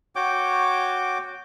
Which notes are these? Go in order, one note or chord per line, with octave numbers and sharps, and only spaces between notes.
F#4 C#5 G5 D6